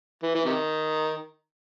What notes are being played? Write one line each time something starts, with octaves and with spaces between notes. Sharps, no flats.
E3
E3
C3 D#3